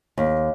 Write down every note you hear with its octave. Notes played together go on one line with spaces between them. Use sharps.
D#2